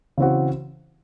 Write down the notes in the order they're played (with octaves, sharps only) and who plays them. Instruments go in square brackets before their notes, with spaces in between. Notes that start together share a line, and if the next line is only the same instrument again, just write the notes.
[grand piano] C#3 E3 C4 F#4